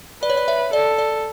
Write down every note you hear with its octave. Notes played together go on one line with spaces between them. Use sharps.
B4 D5
C#5
D5
C#5 E5
A4 D5
D5